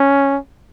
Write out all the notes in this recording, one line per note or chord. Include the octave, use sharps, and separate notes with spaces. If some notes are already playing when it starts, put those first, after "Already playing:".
Already playing: C#4